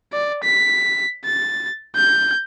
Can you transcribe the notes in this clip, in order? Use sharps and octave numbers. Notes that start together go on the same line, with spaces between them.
D5
B6
A6
G6